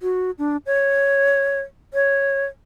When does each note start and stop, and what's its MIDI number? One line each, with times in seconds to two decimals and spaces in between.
0.01 0.31 66
0.39 0.57 62
0.66 1.60 73
1.94 2.46 73